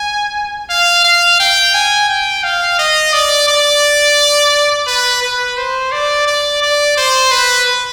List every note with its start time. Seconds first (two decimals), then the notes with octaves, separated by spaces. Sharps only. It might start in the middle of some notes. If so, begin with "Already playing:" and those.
Already playing: G#5
0.69 F5
1.04 F5
1.40 G5
1.74 G#5
2.09 G5
2.44 F5
2.79 D#5
3.13 D5
3.48 D5
4.87 B4
5.23 B4
5.57 C5
5.92 D5
6.27 D5
6.62 D5
6.97 C5
7.31 B4